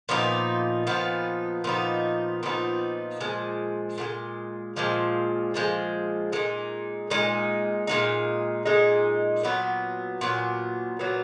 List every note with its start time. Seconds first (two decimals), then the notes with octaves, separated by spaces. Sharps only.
0.09 A#2 F3 B3 D#4
0.87 A#2 F3 B3 D#4
1.64 A#2 F3 B3 D#4
2.43 A#2 F3 B3 D#4
3.20 A#2 F3 G#3
3.98 A#2 F3 G#3
4.76 A#2 F3 G#3
5.54 A#2 F3 G#3
6.32 A#2 G#3 D#4
7.10 A#2 G#3 D#4
7.87 A#2 G#3 D#4
8.65 A#2 G#3 D#4
9.44 A#2 F#3 B3
10.21 A#2 F#3 B3
10.99 A#2 F#3 B3